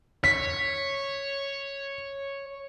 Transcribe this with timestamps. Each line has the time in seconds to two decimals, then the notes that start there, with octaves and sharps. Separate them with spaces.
0.24 C#5 B6